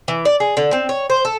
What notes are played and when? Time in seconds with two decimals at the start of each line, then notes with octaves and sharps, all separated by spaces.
0.08 E3
0.25 D5
0.40 G#4
0.57 D3
0.73 C4
0.89 C#5
1.10 C5
1.25 A4